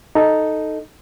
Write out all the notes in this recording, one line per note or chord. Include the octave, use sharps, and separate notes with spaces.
D#4 A4